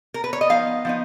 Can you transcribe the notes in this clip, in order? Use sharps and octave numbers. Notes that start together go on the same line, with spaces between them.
A#4
B4
C#5
D#5
F3 B3 D#4 F5
F3 B3 D#4